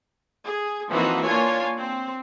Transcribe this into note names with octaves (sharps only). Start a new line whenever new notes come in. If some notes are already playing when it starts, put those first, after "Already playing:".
G#4
E3 F3 A#3 C4 D#4 F#4
A#3 D4 F4 C#5 G#5
C4